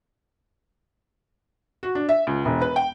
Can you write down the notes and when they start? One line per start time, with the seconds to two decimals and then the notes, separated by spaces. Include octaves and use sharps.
1.83 F#4
1.95 D4
2.09 E5
2.27 C#2
2.45 E1
2.61 B4
2.76 G5